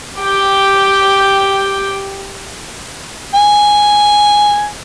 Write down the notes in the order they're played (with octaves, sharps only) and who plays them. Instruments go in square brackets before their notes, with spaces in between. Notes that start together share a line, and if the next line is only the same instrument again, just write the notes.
[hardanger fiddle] G4 G5
[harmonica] G#5